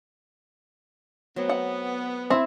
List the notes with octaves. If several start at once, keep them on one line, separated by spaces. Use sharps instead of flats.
F#3 A3 B3 C4
F#5
C4 E4 E5